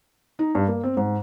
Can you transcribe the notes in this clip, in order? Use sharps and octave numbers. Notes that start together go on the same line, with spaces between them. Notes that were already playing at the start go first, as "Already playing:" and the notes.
D#4
G2
A#3
C4
G#2